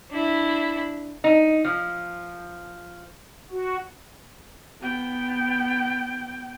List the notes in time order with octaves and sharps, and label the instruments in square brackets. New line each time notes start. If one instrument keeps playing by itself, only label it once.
[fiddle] D4 E4
[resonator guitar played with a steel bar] D#4
F3
[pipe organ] F#4
[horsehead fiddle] B3 G5